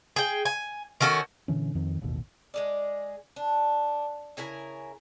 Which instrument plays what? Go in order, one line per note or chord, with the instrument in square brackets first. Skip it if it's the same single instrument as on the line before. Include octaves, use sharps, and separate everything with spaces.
[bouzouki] G#4 G5
G#5
D#3 C#4 F#4 A4
[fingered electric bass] A#2 D3 E3 C#4
F2 D#3 C4
E1 A1 D#2 B2
[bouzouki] G#3 G#4 D5
D4
C#3 E4 A#4 G#5